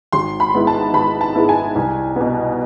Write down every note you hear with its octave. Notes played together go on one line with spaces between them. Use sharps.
G#1 C6
B5
G#2 G#3 B3 E4
A5
G#1 B5
A5
G#2 G#3 B3 E4
G#5
C2
B2 B3